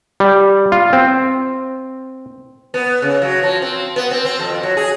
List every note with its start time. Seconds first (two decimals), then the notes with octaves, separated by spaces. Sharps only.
0.20 G3
0.72 F4
0.93 C4
2.74 B3
3.02 C#3
3.22 F#3
3.43 F3
3.62 C4
3.96 B3
4.11 C4
4.25 C4
4.39 F2
4.63 F#3
4.77 G#4